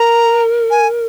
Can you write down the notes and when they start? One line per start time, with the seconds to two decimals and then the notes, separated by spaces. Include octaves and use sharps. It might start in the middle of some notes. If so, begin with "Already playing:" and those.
Already playing: A#4 A#5
0.71 G#5